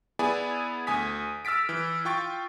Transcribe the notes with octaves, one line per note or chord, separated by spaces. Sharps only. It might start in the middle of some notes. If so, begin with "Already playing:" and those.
B3 E4 G#4 D5 G#5 B5
D2 G#5 D#6 B6
E6 F6 A6 B6 D7
E3
F4 G5 C#6 A6